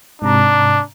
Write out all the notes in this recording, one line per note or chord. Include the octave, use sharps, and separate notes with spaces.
G#2 C3 D4 A#5